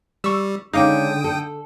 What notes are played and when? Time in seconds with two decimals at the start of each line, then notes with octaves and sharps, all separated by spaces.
0.24 G3 C#6 E6
0.73 D3 G#3 C#4 D#4 F5 G5 D6 D#6
1.24 A4